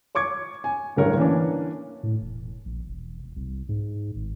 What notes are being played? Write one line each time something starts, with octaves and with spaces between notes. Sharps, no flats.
C#5 C#6 D6 G#6
G#5
D1 G2 A#4 C#5
E3 A#3 C#4 D4
A2
E1
A#1
E1
E1
C2
G#2
G#1